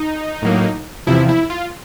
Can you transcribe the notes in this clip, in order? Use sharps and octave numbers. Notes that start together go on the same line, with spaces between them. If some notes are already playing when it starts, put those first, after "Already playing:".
Already playing: D#4
A2 F#3 A#3
E2 C3 F3 E4
E4
F4